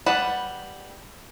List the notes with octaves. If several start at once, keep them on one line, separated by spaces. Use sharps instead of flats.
G3 B4 F#5 A5